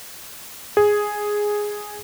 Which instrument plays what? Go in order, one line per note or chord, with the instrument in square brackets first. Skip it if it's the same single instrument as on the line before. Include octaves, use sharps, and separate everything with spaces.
[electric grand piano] G#4